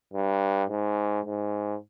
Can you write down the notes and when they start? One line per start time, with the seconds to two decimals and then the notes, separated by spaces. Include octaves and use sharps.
0.14 G2
0.70 G#2
1.26 G#2